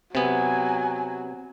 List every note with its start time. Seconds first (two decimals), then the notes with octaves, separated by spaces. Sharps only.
0.15 C3 F#3 B3 C4 G#5